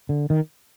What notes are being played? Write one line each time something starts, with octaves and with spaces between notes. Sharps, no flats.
D3
D#3